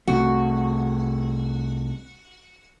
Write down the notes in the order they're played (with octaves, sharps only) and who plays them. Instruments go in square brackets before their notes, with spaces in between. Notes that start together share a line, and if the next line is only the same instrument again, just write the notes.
[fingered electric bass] C2 A3 C4 [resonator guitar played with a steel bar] F#4